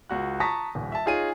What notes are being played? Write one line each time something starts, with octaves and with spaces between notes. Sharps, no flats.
C#2 F#4 F#6
A5 A#5 C#6 D#6 A#6 B6
D#1 A#1
E5 A5
D#4 F4 G#4 C#5 D#7